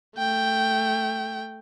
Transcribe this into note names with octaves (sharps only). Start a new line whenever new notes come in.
A3 G5